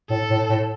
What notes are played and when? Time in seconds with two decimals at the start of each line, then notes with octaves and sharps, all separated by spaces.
0.10 A2 A4
0.30 A2
0.50 A2